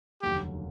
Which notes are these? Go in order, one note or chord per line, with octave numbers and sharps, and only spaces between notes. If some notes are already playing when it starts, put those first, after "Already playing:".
F1 D#2 D3 F#3 A#3 G4